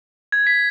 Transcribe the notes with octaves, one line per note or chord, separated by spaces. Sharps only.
G#6
B6